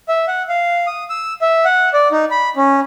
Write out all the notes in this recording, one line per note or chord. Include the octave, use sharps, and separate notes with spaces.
E5
F#5
F5
D#6
E6
E5
F#5
D5
D#4
B5
C#4